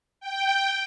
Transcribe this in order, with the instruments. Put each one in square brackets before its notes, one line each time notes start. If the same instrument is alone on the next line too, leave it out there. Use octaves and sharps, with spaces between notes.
[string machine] G5